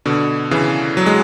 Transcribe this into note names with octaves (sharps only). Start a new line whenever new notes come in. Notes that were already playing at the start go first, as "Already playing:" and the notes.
B2 D3
C#3 E3
F#3
G#3